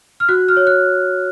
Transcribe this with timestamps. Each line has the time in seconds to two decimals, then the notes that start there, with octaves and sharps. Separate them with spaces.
0.20 F6
0.29 F#4 F#6
0.48 F6
0.57 C#5
0.67 F#6